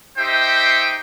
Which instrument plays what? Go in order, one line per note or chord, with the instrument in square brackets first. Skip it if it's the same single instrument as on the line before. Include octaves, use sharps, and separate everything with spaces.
[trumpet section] D#4 G4 C5 E5 G5